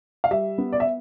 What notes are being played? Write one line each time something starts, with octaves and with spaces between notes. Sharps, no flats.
F5
G3 E5
B3
D5
E5